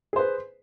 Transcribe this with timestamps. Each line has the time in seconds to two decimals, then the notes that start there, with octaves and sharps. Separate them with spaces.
0.13 G#4
0.16 C5
0.19 B4